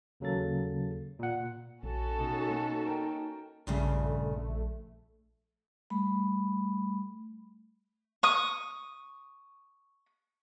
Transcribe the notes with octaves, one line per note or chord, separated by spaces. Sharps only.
D#2 C#3 F#3 A#3 A4 A6
A#2 F#5
A#1 C#4 F#4 A4
B2 D#4
A#3
A#4 G5
A#1 G2 A#2 C#3 A3
G3 A3 B5
C#6 D#6